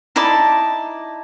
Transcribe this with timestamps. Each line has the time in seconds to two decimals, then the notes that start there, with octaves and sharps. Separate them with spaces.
0.16 D#4 E4 D5 A5